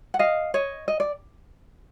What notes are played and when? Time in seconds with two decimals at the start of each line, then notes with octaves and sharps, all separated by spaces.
0.14 F#5
0.19 D#5 F5
0.54 C#5 D#5
0.88 D#5
1.00 D5